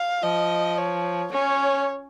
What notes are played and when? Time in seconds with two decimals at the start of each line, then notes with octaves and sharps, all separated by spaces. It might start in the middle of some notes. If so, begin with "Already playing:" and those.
Already playing: F5
0.23 F3 D#5
0.78 C#5
1.32 C#4 C#5